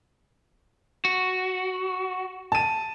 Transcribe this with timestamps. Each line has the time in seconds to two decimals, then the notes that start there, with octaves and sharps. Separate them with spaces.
1.05 F#4
2.52 A5 D#7